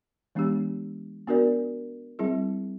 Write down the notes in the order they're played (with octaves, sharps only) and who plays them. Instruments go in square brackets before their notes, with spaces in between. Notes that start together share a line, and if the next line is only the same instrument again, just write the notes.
[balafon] E3 G#3 B3 D4 G4
B3 D4 F#4 A#4 D5
G3 C4 E4 G#4